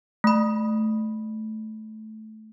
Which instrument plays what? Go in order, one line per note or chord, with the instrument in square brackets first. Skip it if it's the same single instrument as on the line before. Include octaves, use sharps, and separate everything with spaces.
[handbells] A3 B5